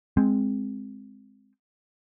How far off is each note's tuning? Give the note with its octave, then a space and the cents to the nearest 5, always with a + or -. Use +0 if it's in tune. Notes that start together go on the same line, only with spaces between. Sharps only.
G#3 +0 C4 +0